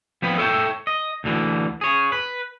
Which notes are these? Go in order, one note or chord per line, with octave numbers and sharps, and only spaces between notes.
F3 G3 B3 C4 B4
A4 C#5 E5 F5 G5
D#5
D2 D3 E3
G#4 C#5
B4